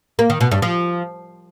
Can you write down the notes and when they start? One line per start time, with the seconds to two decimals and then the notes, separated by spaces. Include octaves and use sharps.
0.19 A#3
0.30 D#3
0.41 B2
0.51 G2
0.62 F3